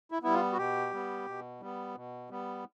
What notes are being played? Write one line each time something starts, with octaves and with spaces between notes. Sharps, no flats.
E4
G3 B3 E4
F4
F#4
B2 G4
G3 B3
B2
G3 B3
B2
G3 B3